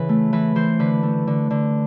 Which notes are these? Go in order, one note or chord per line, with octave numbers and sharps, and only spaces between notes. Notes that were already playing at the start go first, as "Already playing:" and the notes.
Already playing: C#3 E3 B4
A3
E3 B4
E3 C5
D3 B4
A3
D3
D3